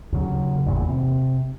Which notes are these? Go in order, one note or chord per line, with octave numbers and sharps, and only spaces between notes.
D#2 C#3 F#3
G#1 E2 A#2
C3